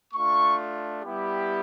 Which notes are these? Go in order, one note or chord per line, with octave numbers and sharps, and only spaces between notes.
A3 D4 F4 C#6
G3 B3 E4 G4